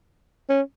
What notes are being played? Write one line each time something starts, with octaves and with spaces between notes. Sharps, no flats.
C#4